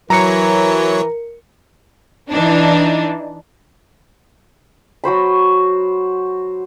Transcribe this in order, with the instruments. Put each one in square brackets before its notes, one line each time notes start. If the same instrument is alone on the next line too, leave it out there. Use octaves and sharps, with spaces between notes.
[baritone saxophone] E3 [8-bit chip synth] F#3 C#5 [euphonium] A#4 [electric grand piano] A#5 C#7
[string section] E3 D4 D#4
[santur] F#3 F#4 C5 B5